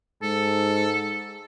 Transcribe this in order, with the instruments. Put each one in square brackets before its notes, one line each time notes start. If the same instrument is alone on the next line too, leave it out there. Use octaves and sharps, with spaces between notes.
[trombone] G#2 [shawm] A4